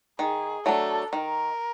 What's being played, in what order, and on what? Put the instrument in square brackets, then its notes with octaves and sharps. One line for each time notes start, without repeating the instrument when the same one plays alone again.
[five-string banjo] D#3 [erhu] G#4
[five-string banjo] F#3 A3 D4 [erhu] A4
[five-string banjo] D#3 [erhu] A#4